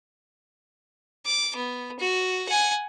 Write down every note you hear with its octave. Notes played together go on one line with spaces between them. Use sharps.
D6
B3
F#4
F#5 G#5